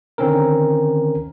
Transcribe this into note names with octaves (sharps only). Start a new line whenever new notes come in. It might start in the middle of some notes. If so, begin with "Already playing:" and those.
D3 D#3 C4 C#4 A#4